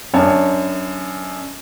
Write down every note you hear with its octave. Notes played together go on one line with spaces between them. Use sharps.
F#2 D4 C#5 A5